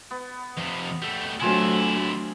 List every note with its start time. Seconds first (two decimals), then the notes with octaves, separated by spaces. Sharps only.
0.11 B3
0.58 F2 C3
1.02 G3 A3
1.40 D3 F#3 A3 C4 D4 E4 F4 G#4